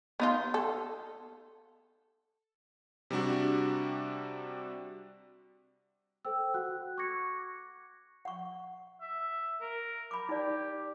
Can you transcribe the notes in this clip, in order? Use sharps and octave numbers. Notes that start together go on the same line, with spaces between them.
B3 D#4 F4
A4
C3 G3 D4 F#4
A4 C5 G5 E6
F#4 F#5 F#6
C#6 D6 F#6 G#6 A#6 C#7
F#5 C#6
E5
A#4
B5 D6
D#4 G4 D5